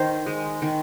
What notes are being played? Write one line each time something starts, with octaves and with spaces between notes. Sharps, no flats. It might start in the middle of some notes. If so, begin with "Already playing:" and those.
Already playing: D#3 C5
G#3
D#3